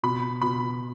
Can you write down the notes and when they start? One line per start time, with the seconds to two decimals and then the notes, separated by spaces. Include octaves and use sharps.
0.03 B2 B5
0.42 B2 B5